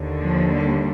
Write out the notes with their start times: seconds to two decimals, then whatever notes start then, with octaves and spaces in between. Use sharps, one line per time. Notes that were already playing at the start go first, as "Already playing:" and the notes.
Already playing: D#2 D3
0.21 F3
0.54 G3